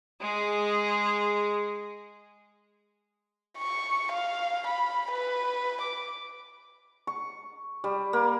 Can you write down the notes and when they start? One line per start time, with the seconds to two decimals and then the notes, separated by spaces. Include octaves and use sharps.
0.21 G#3 G#4
3.57 C#6
4.12 F5
4.66 B5
5.11 B4
5.81 D6
7.07 C#6
7.84 G3
8.13 A#3